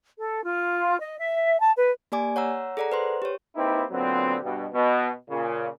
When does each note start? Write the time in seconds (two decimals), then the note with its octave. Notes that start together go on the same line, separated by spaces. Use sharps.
0.18 A4
0.44 F4
0.99 D#5
1.19 E5
1.61 A5
1.77 B4
2.12 A#3 G4 D5 G#5 D6
2.36 C#5 F#5 A#5 E6
2.77 G#4 A4 D5 F#5 A#5
2.92 B4 C5 C6
3.22 G4 C#5
3.56 A#3 C4 D#4 E4 G4 B4
3.91 A#2 D3 F#3 B3 C4
4.42 G2 B2
4.73 B2
5.29 A#2 C#3